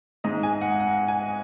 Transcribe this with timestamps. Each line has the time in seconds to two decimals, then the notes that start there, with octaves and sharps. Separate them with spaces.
0.24 G#2 G#3 D#4 D#5
0.43 G#5
0.61 F#5
0.80 F#5
1.08 G#5